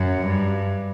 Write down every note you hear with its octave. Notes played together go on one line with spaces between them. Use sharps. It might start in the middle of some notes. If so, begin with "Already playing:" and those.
Already playing: F#2
G2